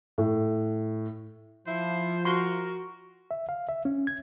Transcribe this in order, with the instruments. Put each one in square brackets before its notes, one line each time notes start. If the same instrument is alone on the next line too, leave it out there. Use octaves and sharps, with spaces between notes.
[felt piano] A2
[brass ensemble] F3 [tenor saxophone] E4 [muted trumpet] C5
[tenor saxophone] F#4 [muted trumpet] A#4 [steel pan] C6
[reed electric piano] E5
F5
E5
C#4
G#6